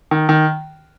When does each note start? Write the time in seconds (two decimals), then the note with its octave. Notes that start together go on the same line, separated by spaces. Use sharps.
0.11 D#3
0.29 D#3